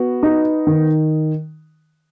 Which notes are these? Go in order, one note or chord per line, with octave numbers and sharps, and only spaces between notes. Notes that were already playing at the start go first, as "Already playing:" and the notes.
Already playing: B3 F#4
D#4
D#3